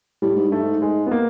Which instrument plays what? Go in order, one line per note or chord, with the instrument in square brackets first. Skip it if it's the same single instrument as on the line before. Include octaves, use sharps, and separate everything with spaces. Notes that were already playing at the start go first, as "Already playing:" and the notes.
[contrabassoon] A2 [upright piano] G3
[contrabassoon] G#2
[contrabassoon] G2 [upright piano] A3
[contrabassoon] G#2
[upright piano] G#3
B3
A#3